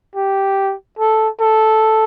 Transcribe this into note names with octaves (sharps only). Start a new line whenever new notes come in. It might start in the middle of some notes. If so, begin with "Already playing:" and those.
G4
A4
A4